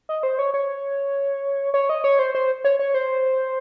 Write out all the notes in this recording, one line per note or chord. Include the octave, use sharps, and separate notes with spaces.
D#5
C5
C#5
C#5
C#5
D#5
C#5
C5
C5
C#5
C#5
C5